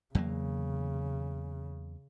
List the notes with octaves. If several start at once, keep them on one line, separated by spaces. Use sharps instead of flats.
E2 C#3 F#3 A#3